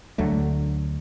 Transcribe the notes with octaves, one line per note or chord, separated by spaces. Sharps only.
D2 D3 F#3 A3